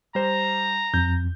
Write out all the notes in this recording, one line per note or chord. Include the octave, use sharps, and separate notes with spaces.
G3 C5 A#5
F2 G6